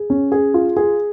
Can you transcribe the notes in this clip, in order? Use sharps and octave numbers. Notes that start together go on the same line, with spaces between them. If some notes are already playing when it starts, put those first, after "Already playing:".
Already playing: G#4
C#4
G#4
F4
G#4